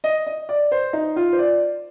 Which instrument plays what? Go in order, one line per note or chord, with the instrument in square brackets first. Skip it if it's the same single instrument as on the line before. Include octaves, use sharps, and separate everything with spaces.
[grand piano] D#5
D#5
D5
C5
D#4
F4
C5
D5